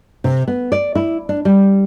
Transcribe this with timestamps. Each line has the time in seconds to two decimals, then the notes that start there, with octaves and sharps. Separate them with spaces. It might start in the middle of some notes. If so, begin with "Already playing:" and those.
0.24 C3
0.48 B3
0.72 D5
0.95 E4
1.29 D4
1.45 G3